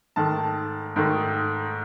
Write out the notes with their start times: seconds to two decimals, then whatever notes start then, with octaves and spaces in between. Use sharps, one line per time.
0.16 G#2 D#3 A3 A5
0.96 G#2 D#3 A3